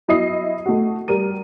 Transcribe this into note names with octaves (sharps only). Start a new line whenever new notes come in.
F#3 E4 D#5 D#6 C7
A3 F#4
G3 A#4 D#7